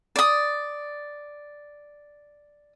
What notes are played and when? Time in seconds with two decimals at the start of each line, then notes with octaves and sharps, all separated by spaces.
0.16 D5 D#6